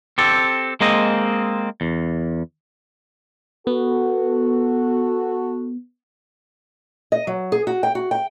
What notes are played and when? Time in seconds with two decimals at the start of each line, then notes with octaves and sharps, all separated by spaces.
0.18 C4 G4 A4
0.81 G#3 A#3 C4 D#5
1.81 E2
3.67 B3 F#4 A4
7.12 D#5
7.27 F#3
7.52 G#4
7.67 F#4
7.83 G5
7.95 F#4
8.11 G5